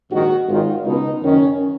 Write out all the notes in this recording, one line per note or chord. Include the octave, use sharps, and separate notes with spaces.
A#1 G#2 D#3 F#4
G#1 G#2 D#3 F4
C#2 B2 D#4
F#1 F#2 D#3 C#4